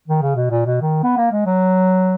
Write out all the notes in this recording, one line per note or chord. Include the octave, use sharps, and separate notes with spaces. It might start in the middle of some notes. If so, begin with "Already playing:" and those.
D#3
C#3
B2
A#2
B2
D#3
B3
A#3
G#3
F#3